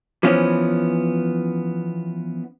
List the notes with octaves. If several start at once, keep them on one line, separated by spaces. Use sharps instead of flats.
E3 F3 B3 C#4